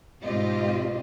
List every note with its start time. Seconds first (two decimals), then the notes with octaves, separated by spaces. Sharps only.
0.23 G#2 B2 C4 F4 G4 D#5